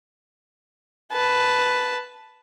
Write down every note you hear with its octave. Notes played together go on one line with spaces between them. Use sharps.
B4 A5